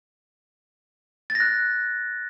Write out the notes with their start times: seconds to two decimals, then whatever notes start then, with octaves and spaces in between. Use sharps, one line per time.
1.30 A6
1.35 A#6
1.40 F#6